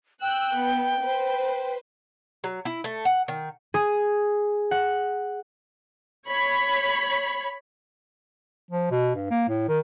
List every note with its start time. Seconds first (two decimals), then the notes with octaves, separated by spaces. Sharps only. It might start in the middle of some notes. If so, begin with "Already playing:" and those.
0.22 G5 E6 F#6
0.55 B3
1.03 B4 C5
2.44 F#3
2.65 E4
2.84 A3
3.05 F#5
3.28 D#3
3.74 G#4
4.71 F#5
6.27 C#5 B5
8.71 F3
8.91 B2
9.16 G2
9.30 A#3
9.49 A2
9.68 D#3